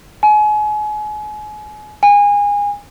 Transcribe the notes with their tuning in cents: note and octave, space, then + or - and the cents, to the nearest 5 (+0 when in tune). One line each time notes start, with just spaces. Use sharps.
G#5 +30
G#5 -25